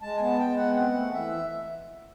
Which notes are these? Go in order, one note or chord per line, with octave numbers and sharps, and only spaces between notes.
G#3 A5
G#5
B3 A5
G#3 G5
B3 F#5
C4 F#5
A3
E3 E5